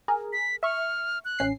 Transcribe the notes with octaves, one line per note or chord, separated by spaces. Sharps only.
G#4 A#4
B6
E5 C#6 F6
F#6
A1 C#4 C7